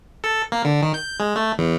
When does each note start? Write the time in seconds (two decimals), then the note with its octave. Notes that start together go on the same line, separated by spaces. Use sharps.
0.24 A4
0.52 A#3
0.65 D3
0.82 D#3
0.94 G6
1.20 G#3
1.36 A3
1.58 E2